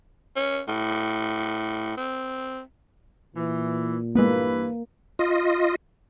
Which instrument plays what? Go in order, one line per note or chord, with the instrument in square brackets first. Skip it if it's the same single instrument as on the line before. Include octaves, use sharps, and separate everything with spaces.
[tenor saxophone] C#4
A2
C4
[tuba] A#2 [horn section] E3
[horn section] G2 E3 B4 [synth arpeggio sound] G#3 B3 [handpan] A#3
[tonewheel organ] F4 D#5